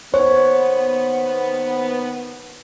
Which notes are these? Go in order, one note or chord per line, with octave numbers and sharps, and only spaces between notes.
D#2 D#3 B3 C5 C#5